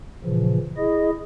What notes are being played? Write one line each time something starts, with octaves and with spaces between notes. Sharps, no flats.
A#2 C#3 E3 F3
E4 G#4 D#5